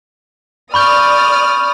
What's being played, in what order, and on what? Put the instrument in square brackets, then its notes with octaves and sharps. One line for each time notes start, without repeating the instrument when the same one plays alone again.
[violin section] D5 D#6 F6 [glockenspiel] B5 C#6 G6